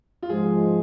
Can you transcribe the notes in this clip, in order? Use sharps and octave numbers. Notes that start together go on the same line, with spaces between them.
F4
G#2 F3 G#3 G#4